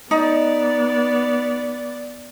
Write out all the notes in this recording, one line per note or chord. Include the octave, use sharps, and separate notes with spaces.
B3 D#4 D5